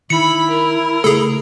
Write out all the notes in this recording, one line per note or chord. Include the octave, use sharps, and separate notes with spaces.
D#3 E4 B5 C#7
A#4
C#3 A3 G#4 A4